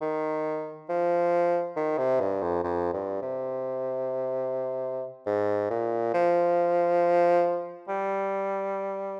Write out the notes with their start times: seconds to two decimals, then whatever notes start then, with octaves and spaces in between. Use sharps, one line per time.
0.02 D#3
0.89 F3
1.76 D#3
1.98 C3
2.20 G2
2.42 F2
2.64 F2
2.94 G2
3.22 C3
5.26 G#2
5.70 A#2
6.14 F3
7.88 G3